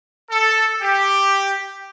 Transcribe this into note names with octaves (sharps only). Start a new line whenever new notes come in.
A4
G4